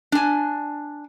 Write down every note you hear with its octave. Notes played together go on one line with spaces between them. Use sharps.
D4 G#5